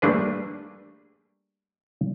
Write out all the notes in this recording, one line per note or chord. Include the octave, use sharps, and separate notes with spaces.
G3 A3 A#3 D4 G#4 B4